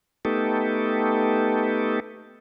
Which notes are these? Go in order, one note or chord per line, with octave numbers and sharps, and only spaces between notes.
A3 B3 D#4 G4 A4